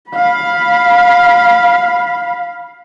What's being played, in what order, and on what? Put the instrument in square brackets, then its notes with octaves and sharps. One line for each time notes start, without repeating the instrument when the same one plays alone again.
[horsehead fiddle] F5 B5